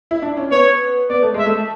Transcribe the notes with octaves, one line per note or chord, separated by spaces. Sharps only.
E4
D4
C#4
B3 C#5
B3 D5
A3
G#3 E5
A3